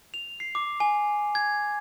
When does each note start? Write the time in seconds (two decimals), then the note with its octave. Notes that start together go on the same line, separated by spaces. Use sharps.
0.14 F7
0.40 C7
0.55 D6
0.80 G#5
1.35 G#6